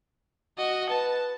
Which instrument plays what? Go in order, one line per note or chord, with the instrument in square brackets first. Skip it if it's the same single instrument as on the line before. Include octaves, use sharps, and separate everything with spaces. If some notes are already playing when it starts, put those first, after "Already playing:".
[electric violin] F#4 D#5
[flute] B4 [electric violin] A5